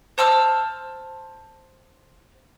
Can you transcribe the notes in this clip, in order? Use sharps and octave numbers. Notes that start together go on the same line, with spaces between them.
C5 A5 E6 F6